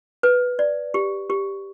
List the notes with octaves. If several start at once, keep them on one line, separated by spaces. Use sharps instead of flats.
B4
D5
G4
G4